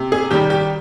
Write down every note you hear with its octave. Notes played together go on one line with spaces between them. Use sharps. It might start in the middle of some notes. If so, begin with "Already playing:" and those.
Already playing: C3
G#4
D#3 G3 G4
G4